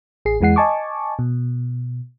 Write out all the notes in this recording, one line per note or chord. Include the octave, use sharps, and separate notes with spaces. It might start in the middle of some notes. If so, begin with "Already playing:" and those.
A1 G#4 C7
E2 E3 G#3 F#5 C7
D#5 G#5 A5 C#6 D6
B2